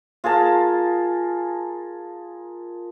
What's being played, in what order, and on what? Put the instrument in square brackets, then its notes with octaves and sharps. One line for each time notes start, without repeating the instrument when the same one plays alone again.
[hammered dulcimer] F4 G#4 A#4 A5